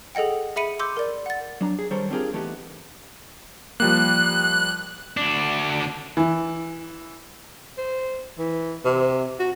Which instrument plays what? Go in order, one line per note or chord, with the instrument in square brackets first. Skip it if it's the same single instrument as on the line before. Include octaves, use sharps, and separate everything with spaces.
[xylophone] G#4 A4 D#5 F#5 G5
G#4 E5 B5 C#7 D#7
C6 D6 E6 G6
A#4 D5
F#5 A6
[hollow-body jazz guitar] F#3 D4 A#5
G#4
D#3 G3 A4 A#4 C5 C#5
C4 D4 F4 G4 G#4 A#4
E3 A3 B3 D#4 G4
[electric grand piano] F3 G3 A#3 [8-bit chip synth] F#6
[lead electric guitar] D2 D4
[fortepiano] E3
[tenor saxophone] C5
E3
C3
F#4